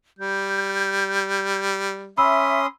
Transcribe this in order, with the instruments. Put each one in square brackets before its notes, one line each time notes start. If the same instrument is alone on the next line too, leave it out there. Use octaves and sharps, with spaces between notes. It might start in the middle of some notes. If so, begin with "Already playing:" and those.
[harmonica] G3 [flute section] G6
[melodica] C#4 C6 D#6 [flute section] E5 [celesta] B5 E6